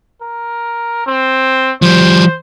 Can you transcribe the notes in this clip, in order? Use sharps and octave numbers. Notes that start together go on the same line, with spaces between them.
A#4
C4
F3 G3 C5